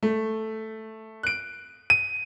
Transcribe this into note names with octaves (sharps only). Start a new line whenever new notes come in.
A3
F#6 D7
D#7